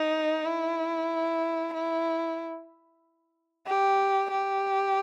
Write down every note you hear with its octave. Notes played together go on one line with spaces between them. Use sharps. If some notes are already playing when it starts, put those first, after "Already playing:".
Already playing: D#4
E4
E4
G4
G4